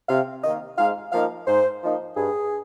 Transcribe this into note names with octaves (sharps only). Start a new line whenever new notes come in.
C3 F5
D#3 A#3 D#5
G#2 F5
F3 A#3 D#4 F5
G#2 C5
F3 A#3 D#4
G2 G#4